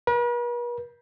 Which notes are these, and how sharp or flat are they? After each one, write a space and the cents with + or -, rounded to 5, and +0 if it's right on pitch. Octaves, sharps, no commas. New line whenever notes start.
B4 -45